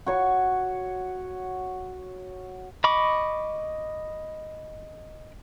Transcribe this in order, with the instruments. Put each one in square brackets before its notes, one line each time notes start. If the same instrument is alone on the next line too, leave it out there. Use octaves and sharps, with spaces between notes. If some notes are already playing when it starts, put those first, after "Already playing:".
[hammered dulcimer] F#4 C#5 C#6
[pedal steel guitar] D#5 B5 C#6 D6